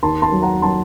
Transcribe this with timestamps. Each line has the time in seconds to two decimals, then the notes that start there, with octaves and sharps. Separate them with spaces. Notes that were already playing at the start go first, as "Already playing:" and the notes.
0.03 D#2 A5 C6
0.22 A5 C6
0.32 F#3
0.42 F#5 A#5
0.62 F#3 A5 C6